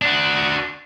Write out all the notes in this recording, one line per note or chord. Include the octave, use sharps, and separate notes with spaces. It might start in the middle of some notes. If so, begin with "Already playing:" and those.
D4 F#4